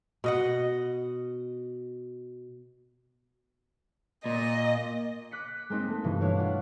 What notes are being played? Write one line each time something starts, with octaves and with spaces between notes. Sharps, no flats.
B2 D#5 F#5
A#2 D#5
D6 F#6 B6 C#7
G#3 A#3 C4 D#4
A3
G2 B2 E3
D4 E4 C#5 F5
F4 F#5